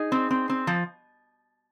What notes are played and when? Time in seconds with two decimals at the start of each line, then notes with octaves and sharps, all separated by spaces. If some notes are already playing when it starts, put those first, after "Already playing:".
Already playing: D#4 G#4
0.12 C4
0.31 C4
0.49 C4
0.67 F3